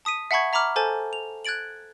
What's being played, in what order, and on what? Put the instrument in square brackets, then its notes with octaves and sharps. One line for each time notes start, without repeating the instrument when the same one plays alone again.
[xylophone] A5 D#6 B6 D#7
E5 F#5 A5 B5 C#6 G#6
E5 A#5 B5 D6 F6
A4 C5 G#5 A5 A6
F7
F#6 G#6 A6 D7 F#7